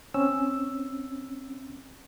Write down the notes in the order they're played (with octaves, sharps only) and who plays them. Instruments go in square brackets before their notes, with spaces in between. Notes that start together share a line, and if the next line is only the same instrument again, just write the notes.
[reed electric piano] C4 C#4 E6